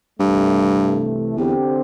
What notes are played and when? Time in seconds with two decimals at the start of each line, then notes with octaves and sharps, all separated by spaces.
0.20 C2 G2 C3 E3 A3
1.37 E2 D3 C4 G4 C5